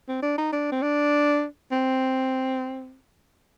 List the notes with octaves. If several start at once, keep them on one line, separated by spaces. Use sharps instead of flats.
C4
D4
D#4
D4
C4
D4
C4